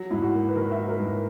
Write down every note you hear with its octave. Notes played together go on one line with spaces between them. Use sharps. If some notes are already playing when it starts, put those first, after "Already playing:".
Already playing: F#3
G#2 E4
F#4
A#3
B4
D#3 A#4
E5
F#3
A#4
G#2